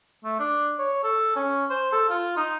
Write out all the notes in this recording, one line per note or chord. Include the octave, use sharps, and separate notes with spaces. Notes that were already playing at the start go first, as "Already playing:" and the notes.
A3
D4
C#5
A4
C#4
C5
A4
F4
D#4